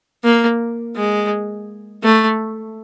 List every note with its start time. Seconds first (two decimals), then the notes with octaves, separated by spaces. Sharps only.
0.24 A#3
0.96 G#3
2.04 A3